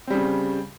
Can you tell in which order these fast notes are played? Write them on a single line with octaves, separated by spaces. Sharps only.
C4 G3 C#3